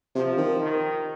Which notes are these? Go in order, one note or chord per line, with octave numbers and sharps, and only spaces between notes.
C3 F3
D#3
D#3